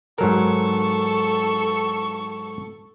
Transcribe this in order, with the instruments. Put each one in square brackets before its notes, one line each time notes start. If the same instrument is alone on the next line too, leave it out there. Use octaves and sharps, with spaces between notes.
[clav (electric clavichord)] G#2 F#3 A#4 [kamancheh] A4 C#6